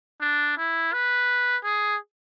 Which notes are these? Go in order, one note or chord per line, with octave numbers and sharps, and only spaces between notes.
D4
E4
B4
G#4